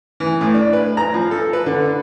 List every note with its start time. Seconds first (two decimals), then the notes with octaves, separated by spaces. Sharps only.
0.20 E3
0.41 A2
0.54 D4
0.73 B4
0.97 A#5
1.14 F3
1.31 A4
1.53 B4
1.66 D3